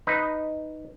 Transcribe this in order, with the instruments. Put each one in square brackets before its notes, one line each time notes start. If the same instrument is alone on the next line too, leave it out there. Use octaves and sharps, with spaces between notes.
[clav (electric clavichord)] D#4 B4